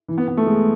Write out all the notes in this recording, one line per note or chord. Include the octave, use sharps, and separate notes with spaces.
E3
B3
B3
A3
G#3